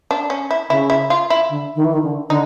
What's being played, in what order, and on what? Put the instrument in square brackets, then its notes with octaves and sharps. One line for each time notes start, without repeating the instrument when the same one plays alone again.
[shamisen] D4
C#4
E4
[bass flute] C#3 [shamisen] E4
[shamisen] E4
F4
E4
[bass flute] D3
D#3
E3
D#3
D3
[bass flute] D3 [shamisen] D#4